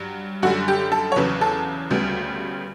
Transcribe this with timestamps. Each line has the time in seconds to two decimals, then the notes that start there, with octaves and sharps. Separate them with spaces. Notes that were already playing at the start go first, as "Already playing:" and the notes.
Already playing: G2 F#3
0.43 F#2 D3 G3 F#4
0.68 G4
0.92 A4
1.12 C#5
1.16 E2 C#3 F#3 B4
1.41 A4
1.91 D2 C#3 G3 B3